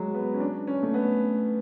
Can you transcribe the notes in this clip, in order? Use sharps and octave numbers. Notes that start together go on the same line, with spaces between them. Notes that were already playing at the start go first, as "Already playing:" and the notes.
Already playing: F#3 G#3
B3
C#4
D4
C#4
A3
B3